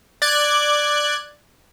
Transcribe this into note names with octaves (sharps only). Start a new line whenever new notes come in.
D5 F#6 G#6